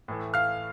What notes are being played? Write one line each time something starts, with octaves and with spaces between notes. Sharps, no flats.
A2 E3 A3
F5 F6